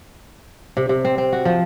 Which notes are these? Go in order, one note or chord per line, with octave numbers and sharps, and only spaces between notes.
C3
C3
C4
C4
F#4
F3